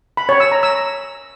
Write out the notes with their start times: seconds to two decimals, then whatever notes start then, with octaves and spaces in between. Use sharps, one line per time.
0.17 B5
0.29 C#5
0.40 E6
0.52 A#5
0.63 E6